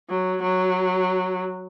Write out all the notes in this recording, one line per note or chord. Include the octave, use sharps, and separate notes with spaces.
F#3
F#3